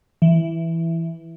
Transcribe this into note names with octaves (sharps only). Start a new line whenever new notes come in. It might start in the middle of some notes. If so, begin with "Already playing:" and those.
E3